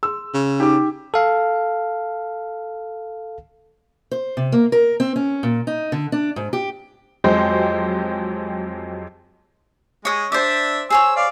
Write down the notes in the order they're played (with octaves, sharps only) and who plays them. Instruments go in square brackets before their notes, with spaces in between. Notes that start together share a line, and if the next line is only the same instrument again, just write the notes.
[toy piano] G#4 C6 [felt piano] E6
[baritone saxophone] C#3
[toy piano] D#4 [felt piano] G4 D6
[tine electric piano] A4 F5
[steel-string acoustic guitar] C5
C3
A#3
A#4
C4
C#4
A#2
D#4
D3
D4
G#2
G4
[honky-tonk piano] F2 F#3 G#3 G4 C5
[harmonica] G#3 [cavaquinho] C#5 D#6
[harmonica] D4 E5 [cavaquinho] C5 D5
[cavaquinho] G#4 C5 C#5 [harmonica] E6
[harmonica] D5 F5